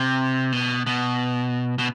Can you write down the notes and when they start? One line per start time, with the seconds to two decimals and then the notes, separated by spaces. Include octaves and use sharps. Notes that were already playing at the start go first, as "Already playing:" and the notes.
Already playing: C3
0.52 B2
0.86 B2
1.78 B2